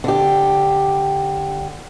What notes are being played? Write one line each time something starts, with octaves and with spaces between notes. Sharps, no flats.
D3 G4